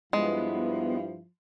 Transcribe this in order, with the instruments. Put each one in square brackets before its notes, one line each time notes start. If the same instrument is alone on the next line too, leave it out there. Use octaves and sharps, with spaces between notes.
[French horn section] G2 E4 [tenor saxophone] F3 [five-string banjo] G#3 [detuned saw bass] B3